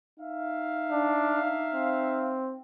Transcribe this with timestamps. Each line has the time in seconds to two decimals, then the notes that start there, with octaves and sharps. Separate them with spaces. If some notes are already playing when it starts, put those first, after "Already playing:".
0.20 D#4 E5 F5
0.92 D4
1.74 C4